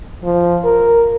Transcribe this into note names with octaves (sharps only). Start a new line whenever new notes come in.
F3
A#4